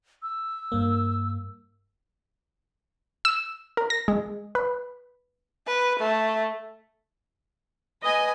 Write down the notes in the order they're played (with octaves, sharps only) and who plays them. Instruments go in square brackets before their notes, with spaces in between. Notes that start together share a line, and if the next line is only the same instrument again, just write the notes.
[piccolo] E6
[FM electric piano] G2 A#3
[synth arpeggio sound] E6
A#4
A#6
G#3
B4
[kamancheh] B4
A3
[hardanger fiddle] B4 G#5 [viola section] D#5